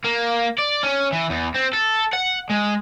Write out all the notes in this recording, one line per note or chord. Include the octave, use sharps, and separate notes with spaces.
A#3
D5
C#4
E3
E2
C4
A4
F#5
G#3